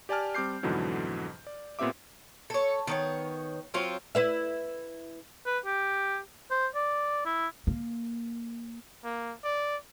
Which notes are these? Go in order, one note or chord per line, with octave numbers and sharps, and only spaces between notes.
G4 D5 G#5 A5 F6
G3 C4 A5 D6 G6 C7
F2 G#2 B2 D3 E3 F#3
D5
A#2 B3 C4 G4 E5 D6
A4 C#5
D#3 B3 C#5
F#3 C4 F4 F5
E4 B4 E5
B4
G4
C5
D5
E4
A#3
A#3
D5